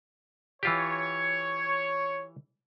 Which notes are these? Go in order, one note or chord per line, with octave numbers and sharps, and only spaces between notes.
E3 F4 G4 C#5